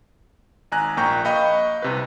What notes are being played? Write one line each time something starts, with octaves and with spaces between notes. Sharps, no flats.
G#1 G#5 A#5 F#6
A#1 A#3 G5 A#5 C#6 G6
D#5 F5 G5 B5 C#6 G6
C2 C3 B4